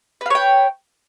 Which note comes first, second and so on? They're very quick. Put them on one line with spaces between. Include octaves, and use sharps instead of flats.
B4 F5 C#5 G5